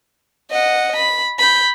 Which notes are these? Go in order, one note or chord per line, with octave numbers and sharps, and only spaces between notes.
D#5 F#5
B5
B5 G6